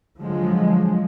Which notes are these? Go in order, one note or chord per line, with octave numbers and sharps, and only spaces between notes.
D3 F3 F#3 G#3